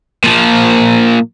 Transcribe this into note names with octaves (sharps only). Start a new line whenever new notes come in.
A#2 F3